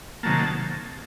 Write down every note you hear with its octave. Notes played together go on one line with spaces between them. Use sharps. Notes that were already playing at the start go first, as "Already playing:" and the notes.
C3 D#3 F#3 A#3 A5